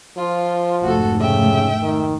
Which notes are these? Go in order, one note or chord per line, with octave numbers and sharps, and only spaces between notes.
F3 F4
F1 G#2 A3 F#4 A4
C#3 E5 G5
D#3